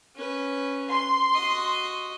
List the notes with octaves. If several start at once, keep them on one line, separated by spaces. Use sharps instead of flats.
C#4 B4
C6
F#4 D#5